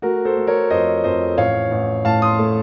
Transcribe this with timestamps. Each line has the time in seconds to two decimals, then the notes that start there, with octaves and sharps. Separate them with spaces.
0.02 A3 F#4 A#4
0.25 A4 C5
0.37 A3
0.47 A#4 C#5
0.70 F2 C5 D#5
1.04 F2 C5 D#5
1.37 A1 C#5 F5
1.71 A1
2.05 A2 F5 A5
2.22 C6 D#6
2.39 A3